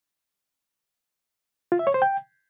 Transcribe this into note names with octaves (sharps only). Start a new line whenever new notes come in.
F4
E5
C#5
C5
G5